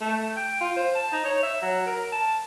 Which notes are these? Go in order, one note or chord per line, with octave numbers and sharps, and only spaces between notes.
A3
G5
F4
C5
A5
D#4
C#5
E5
F#3
A#4
A5